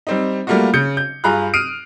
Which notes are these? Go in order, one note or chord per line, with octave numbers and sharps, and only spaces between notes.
G3 C4 D#4
G3 A3 A#3 F4 F#4
C#3 G6 C#7
G6
G2 F4 G#4 A#5 B5 F#6
D#6 F6 C7 D7 D#7